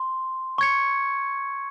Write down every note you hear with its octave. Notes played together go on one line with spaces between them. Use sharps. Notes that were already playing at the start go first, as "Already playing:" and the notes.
Already playing: C6
C#6 G#6 C#7